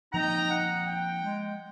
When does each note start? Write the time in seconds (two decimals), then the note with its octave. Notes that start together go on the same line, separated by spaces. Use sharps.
0.14 F3 A#3 C4 D#4 D#5 G5 A#5
0.50 F#5
0.87 G5
1.22 G#3